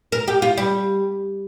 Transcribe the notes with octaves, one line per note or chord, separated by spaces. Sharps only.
A#4
G4
F4
G3